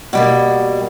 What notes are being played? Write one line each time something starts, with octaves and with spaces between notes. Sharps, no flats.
B2 G3 A#3